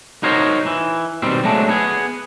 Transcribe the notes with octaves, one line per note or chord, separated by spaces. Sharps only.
D#4 F#4 A#4 C5 C#5 D#5
E3
B2 D#3 G3 C4
F#3 G#3 A3 D4
B3 G#4